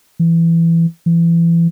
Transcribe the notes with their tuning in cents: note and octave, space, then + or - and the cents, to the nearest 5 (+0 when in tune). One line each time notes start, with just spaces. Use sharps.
E3 +15
E3 +30